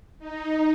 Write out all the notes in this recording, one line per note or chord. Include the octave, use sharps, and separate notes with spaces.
D#4